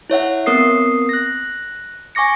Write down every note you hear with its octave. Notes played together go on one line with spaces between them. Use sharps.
E4 C#5 E5 F#5
B3 C4 A#4 D#6 C7
F#6 A#6
G#5 C#6 D6 A#6 C#7